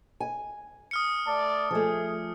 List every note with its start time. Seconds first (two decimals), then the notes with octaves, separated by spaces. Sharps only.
0.20 G#5
0.91 D#6 F6 C#7
1.26 A3 D5 A5
1.71 F3 A3 G#4